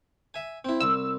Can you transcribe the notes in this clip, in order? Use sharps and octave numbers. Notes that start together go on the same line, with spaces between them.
E5 G#5
C4 E4
C2 E6